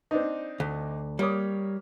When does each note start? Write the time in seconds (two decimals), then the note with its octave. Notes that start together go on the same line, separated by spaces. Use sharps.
0.11 C4 D4 D#4
0.60 D2
1.19 G3 A#3 C#5 D#6